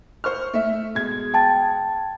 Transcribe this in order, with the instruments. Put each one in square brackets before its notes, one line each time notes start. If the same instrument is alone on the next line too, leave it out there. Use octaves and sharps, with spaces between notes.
[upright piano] C5 C#6 F6
A3 E5
B2 G#3 G#6
[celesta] G5 A5 A6